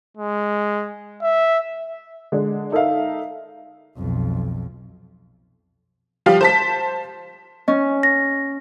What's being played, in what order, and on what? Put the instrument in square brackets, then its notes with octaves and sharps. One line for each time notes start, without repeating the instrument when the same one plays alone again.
[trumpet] G#3
E5
[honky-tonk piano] D3 G#3
D#4 A4 A#4 E5 F5
[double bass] B1 F2
[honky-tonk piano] F3 G3 F5
C5 A5 B6
[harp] C#4 [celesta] D#5
[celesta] A#6